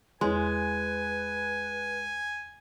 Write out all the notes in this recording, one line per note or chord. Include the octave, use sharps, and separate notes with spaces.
E2 G#3 B4 C#5 G#5 C6